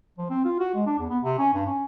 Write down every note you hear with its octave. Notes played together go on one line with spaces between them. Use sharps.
F3
C4
F4
F#4
G#3
D4
E2
B3
C3
C#4
G2
C#4